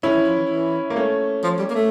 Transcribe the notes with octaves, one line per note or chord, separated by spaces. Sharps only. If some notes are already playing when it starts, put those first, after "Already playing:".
D3 C#4 E4
E3
F3
E3
E3
A#3
A3 C#4
F3
G3
A#3
A3